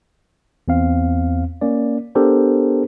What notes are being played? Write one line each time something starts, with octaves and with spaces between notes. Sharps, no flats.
E2 C4 F5
A#3 C#4 D5
B3 D4 G4 A4 A#4 C5